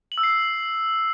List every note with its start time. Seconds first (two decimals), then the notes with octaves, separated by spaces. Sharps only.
0.12 F#7
0.18 E6
0.23 C7